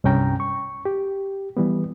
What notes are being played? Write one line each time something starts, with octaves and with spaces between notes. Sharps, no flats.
C2 G2 C#4 G5 A#5
C#6
G4
E3 G3 B3